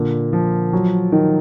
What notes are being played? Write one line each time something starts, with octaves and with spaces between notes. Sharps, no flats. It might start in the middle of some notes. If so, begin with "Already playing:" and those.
Already playing: A#2 D3
F3
F#3
D#3